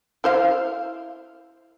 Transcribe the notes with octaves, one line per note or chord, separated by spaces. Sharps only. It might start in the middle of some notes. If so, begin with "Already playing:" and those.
E4 C5 F5